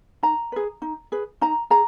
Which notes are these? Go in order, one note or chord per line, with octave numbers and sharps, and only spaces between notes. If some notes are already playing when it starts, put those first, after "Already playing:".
D#4 A#5
G#4 B4
D#4
G#4 B4
D#4 A#5
G#4 A#5